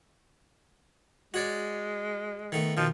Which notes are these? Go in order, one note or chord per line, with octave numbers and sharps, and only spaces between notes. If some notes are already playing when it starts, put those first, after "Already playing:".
G#3 F#4 C#5 D5
D#3 A3 B3
B2 D#3 F3